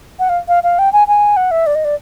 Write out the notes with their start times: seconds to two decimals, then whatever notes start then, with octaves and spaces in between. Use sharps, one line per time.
0.19 F#5
0.29 F5
0.48 F5
0.63 F5
0.79 G5
0.93 G#5
1.08 G#5
1.37 F#5
1.51 E5
1.67 D5
1.75 D#5
1.85 D5